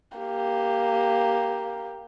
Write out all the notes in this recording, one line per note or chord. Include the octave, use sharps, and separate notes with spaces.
A#3 G4